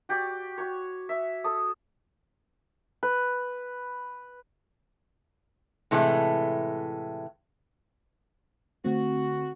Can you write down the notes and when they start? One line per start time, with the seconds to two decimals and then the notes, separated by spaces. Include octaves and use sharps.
0.09 F#4 G4 D5
0.58 F#4 C#5
1.09 E5
1.44 A4 D#6
3.03 B4
5.91 A2 C3 E3 G#3 A3
8.84 D3 A3 C4 F#4